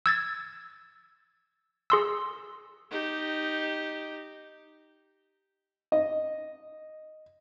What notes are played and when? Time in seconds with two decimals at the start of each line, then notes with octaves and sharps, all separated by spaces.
0.06 E6 G#6 A6
1.90 G#4 C6 E6
2.91 D#4 G4
5.92 D#5